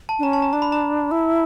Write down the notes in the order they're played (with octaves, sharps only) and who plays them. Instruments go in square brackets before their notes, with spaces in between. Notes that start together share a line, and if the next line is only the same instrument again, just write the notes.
[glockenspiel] A5
[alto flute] D4
[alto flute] C#4 [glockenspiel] A#5
[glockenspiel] A5
A#5
[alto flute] D4 [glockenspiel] A#5
[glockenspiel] B5
A#5
[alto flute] E4